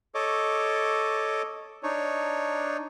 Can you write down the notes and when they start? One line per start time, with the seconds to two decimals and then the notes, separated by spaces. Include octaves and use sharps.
0.15 A4 C#5 D#5 D6
1.83 D4 D#4 C#5